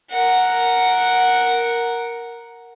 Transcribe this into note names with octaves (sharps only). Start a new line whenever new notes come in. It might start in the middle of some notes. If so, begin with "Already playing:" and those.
A#4 F#5